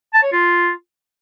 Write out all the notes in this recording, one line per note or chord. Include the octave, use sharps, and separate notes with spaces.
A5
C#5
F4